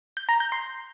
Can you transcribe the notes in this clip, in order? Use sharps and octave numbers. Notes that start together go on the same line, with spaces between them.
G6
A#5
G6
C6